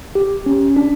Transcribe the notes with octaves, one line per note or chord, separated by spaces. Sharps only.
G4
C#4
D4